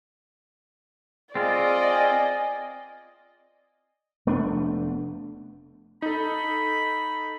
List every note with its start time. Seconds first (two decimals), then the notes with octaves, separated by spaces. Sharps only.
1.35 C4 F4 G#4 D5 D#5
1.91 G#5
4.26 F1 A3 B3 D4
6.02 D#4 A4 B5